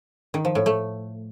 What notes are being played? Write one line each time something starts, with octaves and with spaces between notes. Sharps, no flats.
D#3
F3
A2
A3